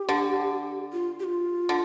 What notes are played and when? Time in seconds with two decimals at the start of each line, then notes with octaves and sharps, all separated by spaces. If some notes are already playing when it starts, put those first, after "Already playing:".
Already playing: G4
0.09 D3
0.92 F4
1.20 G4
1.24 F4
1.69 D3